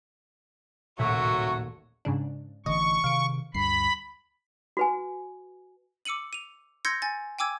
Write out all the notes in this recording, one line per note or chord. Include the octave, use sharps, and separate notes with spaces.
D#1 A1 A#2 F#3 A3 F#4
G#2 C#3 D4
A1 D3 E3 D#5 C#6
C3 D#3 F5 D7
D2 G2 B5 C7
F#4 B4 G#5
D6 E6 C#7 D#7 F#7
D#7 F7
C6 E6 G6 G#6 A#6 C#7
G#5 A6
G5 G#5 D6 E6 G#6